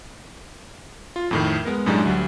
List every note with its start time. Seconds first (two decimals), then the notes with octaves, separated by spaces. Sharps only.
1.16 F4
1.31 F2 A2 D#3
1.65 G#3 B3 A#4
1.86 F#2 A2 G3 G#3 D4 D#4
2.05 D2 F#3 G3